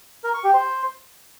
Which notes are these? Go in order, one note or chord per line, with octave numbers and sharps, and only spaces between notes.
A#4
C#6
G4
C5